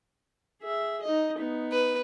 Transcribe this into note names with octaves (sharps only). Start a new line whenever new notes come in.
G#4 E5
D#4 D#5
B3 D#4
B4